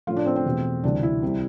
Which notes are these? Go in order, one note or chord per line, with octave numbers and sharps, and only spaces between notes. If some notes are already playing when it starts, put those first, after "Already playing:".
A2 F3 A3 F4
D4
C4
C4
E2 B2 A3
D2 C3 E3 G3 D4
E4
C2 C3 G3